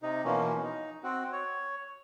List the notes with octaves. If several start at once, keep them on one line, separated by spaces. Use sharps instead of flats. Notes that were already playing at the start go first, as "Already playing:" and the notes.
C3 D#4
B2 E3 F3 A#3 C#4
D#4
C4 F#4
C#5